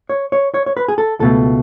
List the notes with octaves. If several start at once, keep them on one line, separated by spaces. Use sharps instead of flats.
C#5
C#5
C#5
C#5
B4
G#4
A4
C#2 B2 A3 A4